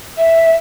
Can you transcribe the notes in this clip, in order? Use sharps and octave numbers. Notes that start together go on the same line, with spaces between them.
E5